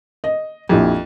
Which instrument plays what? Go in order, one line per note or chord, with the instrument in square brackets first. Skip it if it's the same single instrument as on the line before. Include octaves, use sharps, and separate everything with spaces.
[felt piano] D#5
[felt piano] A#1 E4 G4 [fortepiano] F2